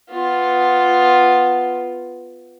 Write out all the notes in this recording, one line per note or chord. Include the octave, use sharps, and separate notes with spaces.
B3 F4